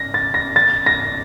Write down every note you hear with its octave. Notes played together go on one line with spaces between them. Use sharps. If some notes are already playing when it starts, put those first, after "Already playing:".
Already playing: A#6
A6
A#6
A6
A#6